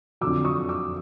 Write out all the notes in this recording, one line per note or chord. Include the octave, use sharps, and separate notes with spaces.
F2 D3 F#3 D6 E6
C#6 D#6
D6 E6